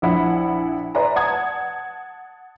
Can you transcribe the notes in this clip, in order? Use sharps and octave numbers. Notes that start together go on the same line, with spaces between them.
A#1 F3 E4 F#5 B5
B4 D5 E5 G#5 A#5 C6
F#5 A5 D#6 G#6